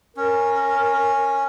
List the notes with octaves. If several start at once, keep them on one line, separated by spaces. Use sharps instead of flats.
C#4 A#4